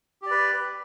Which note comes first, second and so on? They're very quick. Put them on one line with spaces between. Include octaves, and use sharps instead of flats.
G4 D5 B4